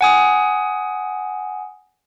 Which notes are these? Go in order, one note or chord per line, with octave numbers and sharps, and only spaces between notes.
F#5 G#5 D#6